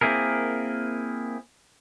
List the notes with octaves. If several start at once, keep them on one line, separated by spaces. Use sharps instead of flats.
A#3 C4 E4 G#4 A#4